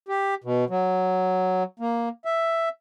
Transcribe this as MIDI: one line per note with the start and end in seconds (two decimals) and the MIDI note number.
0.09 0.35 67
0.44 0.65 47
0.70 1.63 54
1.80 2.09 58
2.25 2.69 76